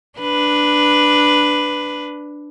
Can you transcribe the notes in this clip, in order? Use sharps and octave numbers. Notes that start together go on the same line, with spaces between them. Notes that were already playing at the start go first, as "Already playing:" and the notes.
D4 B4